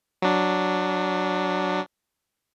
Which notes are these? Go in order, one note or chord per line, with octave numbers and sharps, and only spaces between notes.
F#3 D4